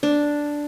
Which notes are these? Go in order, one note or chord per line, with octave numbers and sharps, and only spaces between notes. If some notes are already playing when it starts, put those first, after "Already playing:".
D4